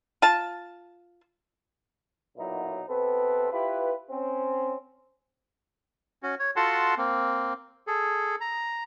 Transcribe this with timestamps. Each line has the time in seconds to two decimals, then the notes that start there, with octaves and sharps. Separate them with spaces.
0.22 F4 A5
2.38 B1 A#2 F#3 D#4 E4
2.88 C3 B3 C4 A4 B4
3.52 E4 F4 G4 B4
4.10 C4 C#4
6.23 C#4 F#4
6.39 C#5
6.56 F4 F#4 A4 F#5 A5 C6
6.98 A#3 C4
7.87 G#4 A4
8.41 A#5